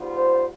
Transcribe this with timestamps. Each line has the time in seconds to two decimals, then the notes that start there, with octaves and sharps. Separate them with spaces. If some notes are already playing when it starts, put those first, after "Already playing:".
Already playing: G#2 G3 B3 F4
0.16 C5